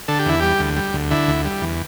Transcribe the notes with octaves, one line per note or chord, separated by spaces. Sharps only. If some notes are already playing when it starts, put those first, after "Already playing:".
D3 A4
G4
E2 E4
G3 G4
D2
G3
D2
D3 E4
D2
G3
E2